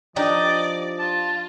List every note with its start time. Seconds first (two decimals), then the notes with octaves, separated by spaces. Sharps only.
0.16 F3 D4 D#4 G4 D5 D#5
0.99 F4 A5